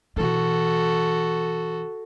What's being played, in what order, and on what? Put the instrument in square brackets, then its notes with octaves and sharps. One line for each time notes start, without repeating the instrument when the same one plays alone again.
[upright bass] B2 E3 [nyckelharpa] F#4 A4